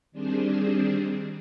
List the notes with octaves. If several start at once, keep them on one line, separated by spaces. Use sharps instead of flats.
D#3 G3 C4 D4 G#4 C5